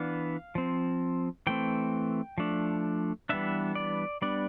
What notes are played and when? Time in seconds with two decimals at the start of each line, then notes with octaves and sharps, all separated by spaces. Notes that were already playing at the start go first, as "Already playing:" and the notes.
Already playing: E3 B3 D4 F5
0.55 F3 C4
1.47 E3 A3 C4 G5
2.38 F3 A3 D4
3.29 E3 G3 B3 D4 E5
3.75 D5
4.22 G3 B3 D4 D5